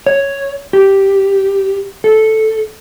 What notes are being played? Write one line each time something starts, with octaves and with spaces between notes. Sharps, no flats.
C#5
G4
A4